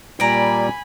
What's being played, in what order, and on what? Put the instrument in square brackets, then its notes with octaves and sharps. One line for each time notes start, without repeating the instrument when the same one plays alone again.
[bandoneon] A#2 G3 [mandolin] D5 A#5 [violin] G#5 B5